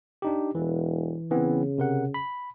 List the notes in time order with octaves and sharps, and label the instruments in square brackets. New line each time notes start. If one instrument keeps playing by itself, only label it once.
[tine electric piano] D4 D#4 G4
[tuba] E1 [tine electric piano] E3
[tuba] C#3 [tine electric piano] E3 B3 C4
[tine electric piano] C3 A#4 F#5
B5